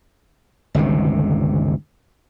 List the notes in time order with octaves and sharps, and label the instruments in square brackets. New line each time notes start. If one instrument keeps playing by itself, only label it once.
[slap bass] G1 C#2 C3 D#3